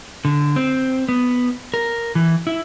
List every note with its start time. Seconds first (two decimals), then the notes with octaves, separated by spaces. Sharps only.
0.25 D3
0.56 C4
1.09 B3
1.74 A#4
2.15 E3
2.47 E4